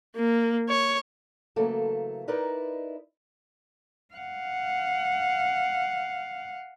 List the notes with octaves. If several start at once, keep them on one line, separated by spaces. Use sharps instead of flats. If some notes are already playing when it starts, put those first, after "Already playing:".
A#3
C#5
C#3 E3 F#3 A3 A#3 A4
D#4 E4 A#4 B4 D5 D#5
F5 F#5